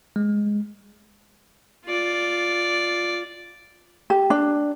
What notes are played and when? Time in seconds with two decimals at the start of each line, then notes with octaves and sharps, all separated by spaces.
0.16 G#3
1.85 F4 D5
4.10 G4
4.30 D4